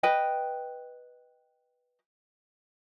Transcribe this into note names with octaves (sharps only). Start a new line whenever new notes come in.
B4 D#5 G5